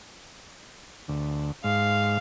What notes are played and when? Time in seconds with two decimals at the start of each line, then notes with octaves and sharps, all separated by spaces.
1.08 D2
1.64 G#2 F5